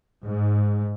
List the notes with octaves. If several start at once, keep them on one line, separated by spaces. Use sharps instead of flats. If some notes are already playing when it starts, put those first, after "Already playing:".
G#2